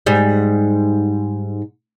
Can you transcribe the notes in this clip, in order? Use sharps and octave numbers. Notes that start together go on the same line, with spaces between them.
G#2 G3